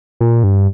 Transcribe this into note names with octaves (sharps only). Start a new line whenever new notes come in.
A#2
G2